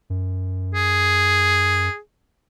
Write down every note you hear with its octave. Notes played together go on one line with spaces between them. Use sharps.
F#2
G#4